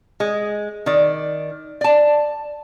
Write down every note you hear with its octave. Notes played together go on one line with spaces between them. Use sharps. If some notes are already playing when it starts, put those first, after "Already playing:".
G#3
D#3 D5
D5 A5